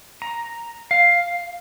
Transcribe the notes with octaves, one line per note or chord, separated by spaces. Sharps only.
A#5
F5